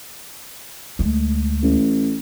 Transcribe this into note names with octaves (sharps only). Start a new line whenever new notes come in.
D2 G#3
A1